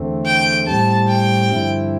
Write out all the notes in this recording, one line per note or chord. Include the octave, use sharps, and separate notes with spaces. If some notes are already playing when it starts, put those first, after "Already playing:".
Already playing: E2 D3 A3 C4
G5
A2 G3 C4 A5
G5
G2 D3 F3 C4 E4